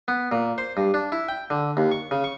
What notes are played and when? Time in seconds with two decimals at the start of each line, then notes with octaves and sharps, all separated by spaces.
0.08 B3
0.32 A#2
0.58 C5
0.77 G2
0.94 D4
1.12 E4
1.29 G5
1.50 D3
1.77 D#2
1.91 C#6
2.11 C#3
2.24 C#6